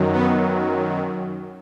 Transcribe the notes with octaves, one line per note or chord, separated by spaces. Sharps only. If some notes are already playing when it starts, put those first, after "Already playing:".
Already playing: F#2 D#3 F#3
B3